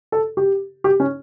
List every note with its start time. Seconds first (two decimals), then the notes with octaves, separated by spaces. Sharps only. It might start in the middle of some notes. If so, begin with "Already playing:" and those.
0.12 A4
0.37 G4
0.84 G4
1.00 C#4